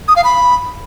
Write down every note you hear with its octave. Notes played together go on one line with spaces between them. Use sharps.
D#6
F5
B5